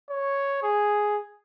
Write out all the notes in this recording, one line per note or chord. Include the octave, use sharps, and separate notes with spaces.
C#5
G#4